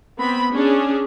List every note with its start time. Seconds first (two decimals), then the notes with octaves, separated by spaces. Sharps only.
0.18 B3 C4 B5
0.51 C#4 D4 G#4